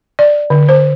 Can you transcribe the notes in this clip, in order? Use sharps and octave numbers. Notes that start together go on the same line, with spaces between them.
D5
D3
C5